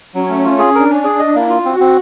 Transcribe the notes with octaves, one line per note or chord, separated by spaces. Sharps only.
F#3 C#4
A3
F4
G#4
D4 A#4
C#4
G#4
D#5
A#3 E4
F4
C4 F#4
C4